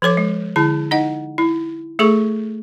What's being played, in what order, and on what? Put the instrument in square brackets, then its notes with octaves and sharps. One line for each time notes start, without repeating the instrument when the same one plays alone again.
[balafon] F3 A4 C#5 D6
G#3
D3 E4 A5
D#4 D#5 F#5
E4
A3 G#4 A4 C#6